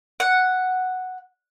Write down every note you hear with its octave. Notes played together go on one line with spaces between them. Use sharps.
F#5